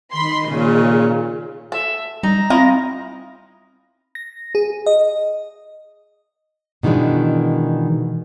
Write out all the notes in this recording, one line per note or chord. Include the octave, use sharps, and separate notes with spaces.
D#3 D#5 B5 C6
A#2 C#3
A4 E5
G3 D#4 A#6
C4 E4 F4 D#5
A#6
G#4
D#5
B2 D#3 E3 G#3 D4